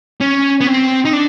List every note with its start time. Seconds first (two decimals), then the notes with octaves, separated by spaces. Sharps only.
0.21 C#4
0.61 B3
0.67 C4
1.05 D#4
1.13 D4